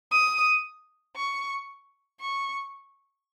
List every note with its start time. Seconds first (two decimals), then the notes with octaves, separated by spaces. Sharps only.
0.11 D#6
1.16 C#6
2.20 C#6